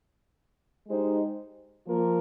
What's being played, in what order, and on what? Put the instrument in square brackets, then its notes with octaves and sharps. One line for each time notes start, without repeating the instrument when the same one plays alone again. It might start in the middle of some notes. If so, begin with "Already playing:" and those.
[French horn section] G#3 D#4 G4 C5
F3 A#3 F4 A#4